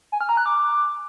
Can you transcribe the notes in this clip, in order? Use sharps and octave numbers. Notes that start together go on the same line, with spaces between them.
G#5
F6
A#5
F#6
D6